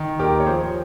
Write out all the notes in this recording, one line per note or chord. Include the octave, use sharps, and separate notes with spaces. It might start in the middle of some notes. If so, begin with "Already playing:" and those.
Already playing: D#3
D#2 G4 A#4
C#5
F3 G#4 C5